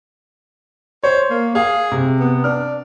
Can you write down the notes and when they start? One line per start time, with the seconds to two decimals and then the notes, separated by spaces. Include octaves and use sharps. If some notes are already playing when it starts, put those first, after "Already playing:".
1.04 C5 C#5
1.30 A#3
1.55 G#4 F5
1.92 C3
2.20 B3
2.44 D4 F6